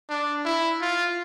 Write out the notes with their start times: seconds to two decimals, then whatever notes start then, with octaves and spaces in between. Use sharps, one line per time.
0.09 D4
0.45 E4
0.81 F4